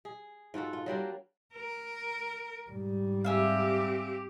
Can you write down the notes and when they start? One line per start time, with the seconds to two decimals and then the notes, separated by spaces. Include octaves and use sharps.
0.05 G#4
0.54 G#2 F4 F#4 A4
0.73 F4
0.86 F#3 G3 A#3 D4
1.54 A#4
2.70 G#2 G3
3.24 C4 G4 G#4 E5 F5